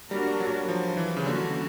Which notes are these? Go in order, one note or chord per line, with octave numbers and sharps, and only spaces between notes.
G3 A#3 D4 F#4 A#4
F#3
F3
E3
C#3
D3 E3 G3 A#3 C#4 F#4